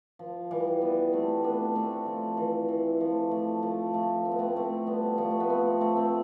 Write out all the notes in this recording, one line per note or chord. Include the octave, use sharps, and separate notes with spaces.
F3
E3 G3
G3 B3
A3 C4
B3 D4
A3 C4
F3
E3
E3
F3 A3
F3 A3
F3 A3
F3 A3
C4
B3
A3 C4
A3 C4
G3 B3
F3 A3
A3
B3
A3 C4
A3 C4
A3 C4